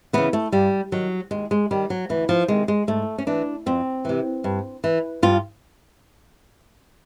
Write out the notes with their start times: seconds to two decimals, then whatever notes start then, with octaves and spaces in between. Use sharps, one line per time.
0.13 C#3 E3 B3
0.33 A3
0.52 G2 G3
0.92 D#3 F#3
1.31 D#2 G#3
1.51 G#3
1.71 D#3 G3
1.90 F#3
2.09 D2 E3
2.29 F3
2.48 C3 D#3 G#3
2.68 G#3
2.87 G#2 A3
3.18 C#4
3.27 E3 D4
3.66 F2 C4
4.05 C3 E3
4.44 G2
4.84 E3
5.22 G2 F4